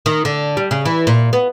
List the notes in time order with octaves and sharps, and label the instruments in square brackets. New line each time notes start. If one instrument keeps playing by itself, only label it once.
[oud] D#3
D3
G3
C#3
E3
A#2
B3